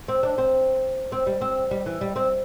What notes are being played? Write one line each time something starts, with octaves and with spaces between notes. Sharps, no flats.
C4
D4
C4
C4
G3
C4
G3
E3
G3
C4